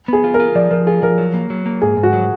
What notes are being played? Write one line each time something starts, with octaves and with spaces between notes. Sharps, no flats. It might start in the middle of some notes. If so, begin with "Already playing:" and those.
B3 G#4
F4
A#4
F4
F3 D5
F3 A#4
F4 G#4
F3 A#4
F#3
A#3
F#3
A#3
G#2 G#4
G#2
F#4
F#3